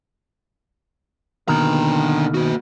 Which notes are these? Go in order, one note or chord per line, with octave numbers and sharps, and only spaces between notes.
D#2 B2 D3 D#3 A#5
A#3 F#4